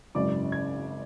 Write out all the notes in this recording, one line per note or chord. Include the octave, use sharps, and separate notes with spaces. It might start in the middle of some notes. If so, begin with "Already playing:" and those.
G#1 F#2 C#3 E3 D5 D6
G#6